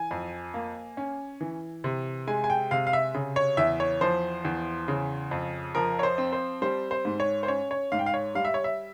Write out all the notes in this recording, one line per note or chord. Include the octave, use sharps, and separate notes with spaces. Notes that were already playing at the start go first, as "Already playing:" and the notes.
Already playing: E3 G#5
F2
A#3
C#4
E3
C3
G#3 G#5
G#5
G5
C3 F5
F5
E5
C#3
C#5
E2 E5
C#5
F3 C5
E2
C#3
F2
F3 A#4
C#5
C5
C4
C5
G3 C5
C5
G#2
C#5
C5
C#4 C#5
C#5
G#2 F5
G5
F5
C#5
G3 F5
E5
C#5
E5